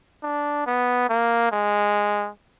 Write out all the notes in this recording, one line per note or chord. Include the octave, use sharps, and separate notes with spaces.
D4
B3
A#3
G#3